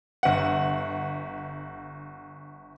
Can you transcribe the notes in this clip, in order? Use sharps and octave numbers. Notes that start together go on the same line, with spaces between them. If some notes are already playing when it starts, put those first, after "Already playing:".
G1 F#5